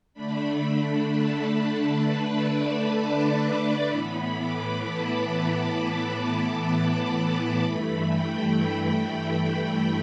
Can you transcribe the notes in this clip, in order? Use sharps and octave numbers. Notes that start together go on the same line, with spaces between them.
D3 A3 D4 B5
A5
B4
D5
D6
B5
A2 E3 B3 B5
D6
A5
D6
B5
A5
B5
G2 E3 A3 B5
G5